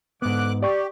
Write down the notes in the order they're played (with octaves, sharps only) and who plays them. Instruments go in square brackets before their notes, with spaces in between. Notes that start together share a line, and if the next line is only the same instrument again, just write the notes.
[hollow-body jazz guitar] G#2 B3 [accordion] D3 D6 F#6
[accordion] G4 [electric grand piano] D5 C#6